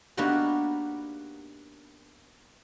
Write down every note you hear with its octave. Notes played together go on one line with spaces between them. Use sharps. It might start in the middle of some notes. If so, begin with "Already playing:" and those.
A#3 B3 D4 D#4 F#4 G4